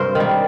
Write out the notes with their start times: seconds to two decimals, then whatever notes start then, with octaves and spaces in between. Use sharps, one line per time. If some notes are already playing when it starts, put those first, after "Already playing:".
Already playing: G2 C3 A#4 C5
0.15 D#3 G3